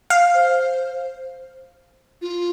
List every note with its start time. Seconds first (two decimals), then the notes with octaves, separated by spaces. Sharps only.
0.10 F5
0.34 C5
2.22 F4